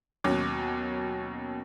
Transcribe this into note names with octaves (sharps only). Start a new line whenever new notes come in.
D#2 B2 F#3 C#4 D6